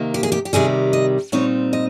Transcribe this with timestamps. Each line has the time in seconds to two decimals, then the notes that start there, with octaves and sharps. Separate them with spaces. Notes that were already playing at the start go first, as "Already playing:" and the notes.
Already playing: C3 D#3 A#3 D#4
0.14 G4
0.23 G#4
0.32 G4
0.45 G4
0.53 C3 D#3 G3 G#4
0.93 D#5
1.32 A#2 G3 C4 D#4 C#5
1.73 D#5